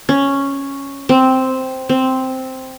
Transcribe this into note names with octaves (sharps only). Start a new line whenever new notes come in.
C#4
C4
C4